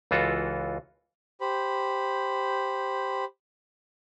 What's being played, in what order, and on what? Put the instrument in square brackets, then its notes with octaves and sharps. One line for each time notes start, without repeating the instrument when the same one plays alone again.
[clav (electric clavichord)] C#2 E3 F4 F#4 A4
[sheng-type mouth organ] G4 C5 B5